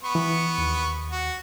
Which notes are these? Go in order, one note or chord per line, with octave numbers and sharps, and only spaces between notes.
B3 C#6
E3
D#2
F#4